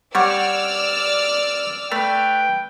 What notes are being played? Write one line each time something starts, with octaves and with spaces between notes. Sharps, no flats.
G3 C#5 D5 F#5 E6 F6
A3 B4 G5